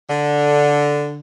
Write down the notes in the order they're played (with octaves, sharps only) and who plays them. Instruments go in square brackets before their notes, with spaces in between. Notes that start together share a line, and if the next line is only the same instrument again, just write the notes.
[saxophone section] D3